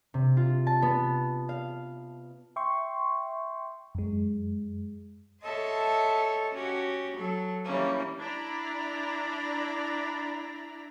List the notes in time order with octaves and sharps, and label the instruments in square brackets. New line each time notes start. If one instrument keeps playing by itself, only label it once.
[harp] C3
F4
A5
B3
F5
[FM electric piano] E5 G5 C6 C#6
F#2 G#3
[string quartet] A4 C#5 D#5 E5 A5 C6
C#4 F#4 G4
F#3 A4
E3 G3 A#3 C#4
[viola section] D4 E4 D5 A#5 B5